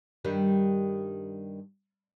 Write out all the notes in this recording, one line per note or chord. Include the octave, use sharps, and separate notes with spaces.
G2 D#3 G3